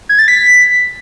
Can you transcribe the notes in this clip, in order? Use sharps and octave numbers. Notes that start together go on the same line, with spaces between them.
G#6
A6
B6